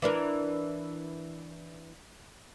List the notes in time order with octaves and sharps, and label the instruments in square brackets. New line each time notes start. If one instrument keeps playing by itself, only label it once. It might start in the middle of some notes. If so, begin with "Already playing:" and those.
[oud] E3 D4 A#4